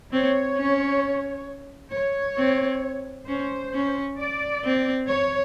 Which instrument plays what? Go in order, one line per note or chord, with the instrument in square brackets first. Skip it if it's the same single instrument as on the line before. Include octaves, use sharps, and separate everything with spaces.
[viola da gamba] C4 [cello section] C#5
[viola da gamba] C#4
[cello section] C#5
[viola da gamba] C4
[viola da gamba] C#4 [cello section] C5
[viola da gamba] C#4
[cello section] D5
[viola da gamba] C4
[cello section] C#5